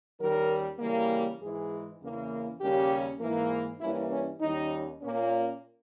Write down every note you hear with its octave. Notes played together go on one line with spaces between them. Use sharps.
D#2 D#3 G3 C#4 A#4
C#3 E3 G3 A#3
G#2 E3 G#3 G#4
E2 C#3 E3 A#3
D#2 C#3 G3 A#3 C#4 G4
G#2 E3 A#3
G2 E3 G3 A#3 C#4 E4
C#4
D#2 D#3 G3 C#4 D#4
A#2 A#3 C#4